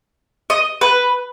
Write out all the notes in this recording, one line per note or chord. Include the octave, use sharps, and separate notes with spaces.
D#5
B4